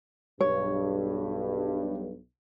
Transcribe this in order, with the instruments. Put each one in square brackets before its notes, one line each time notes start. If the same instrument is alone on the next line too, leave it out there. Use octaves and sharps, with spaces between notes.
[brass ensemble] B1 G2 [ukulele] C#5